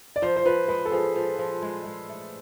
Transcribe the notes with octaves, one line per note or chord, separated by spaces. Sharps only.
D5
F3 C5
C5
F3 B4
G#3 B4
A4
F3 G#4
F3
F3
G#3
G#3
A3